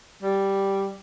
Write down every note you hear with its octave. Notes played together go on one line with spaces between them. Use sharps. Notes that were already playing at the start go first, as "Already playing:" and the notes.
G3